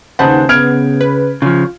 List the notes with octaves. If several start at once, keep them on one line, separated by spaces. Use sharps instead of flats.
D#2 C#3 D#4 B4 C5 F#5 A5
C#3 B3 F6 G#6 D7
B4
C#3 F3 F4